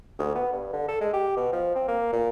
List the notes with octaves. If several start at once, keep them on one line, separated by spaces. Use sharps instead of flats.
D2
B3
G2
D3
A4
G#3
G4
B2
F3
C4
A#3
A#2